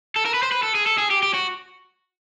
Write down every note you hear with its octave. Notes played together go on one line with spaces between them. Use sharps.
A4
A#4
B4
C5
B4
A4
G#4
A4
G#4
G4
G4
F#4